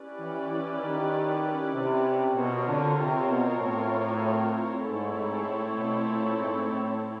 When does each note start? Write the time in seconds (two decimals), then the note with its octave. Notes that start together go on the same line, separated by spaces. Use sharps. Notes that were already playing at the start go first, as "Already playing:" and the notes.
Already playing: C#4 E4 G4 B4 D5
0.19 E3
0.49 E3
0.81 D#3
1.73 C3
2.35 B2 C4 F4 A#4 C#5
2.66 D3
2.97 C3
3.28 B2
3.59 A2
4.83 G#2 A3 C4 E4 A4 C#5
5.15 G#2
5.45 A2
5.76 B2
6.07 A#2
6.38 G#2
6.69 A2